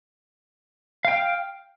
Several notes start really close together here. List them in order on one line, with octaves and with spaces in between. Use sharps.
F5 G5 F6